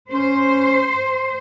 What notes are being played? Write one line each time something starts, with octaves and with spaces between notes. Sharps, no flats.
C#4 C5